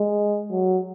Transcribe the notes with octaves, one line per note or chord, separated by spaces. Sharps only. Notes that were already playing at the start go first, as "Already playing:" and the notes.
Already playing: G#3
F#3